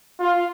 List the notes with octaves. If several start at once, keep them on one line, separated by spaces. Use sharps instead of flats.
F4